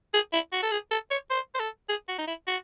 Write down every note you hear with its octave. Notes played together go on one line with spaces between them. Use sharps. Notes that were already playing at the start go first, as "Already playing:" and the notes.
G#4
E4
F#4
A4
G#4
A4
C#5
C5
C5
A4
G#4
F#4
D#4
E4
F#4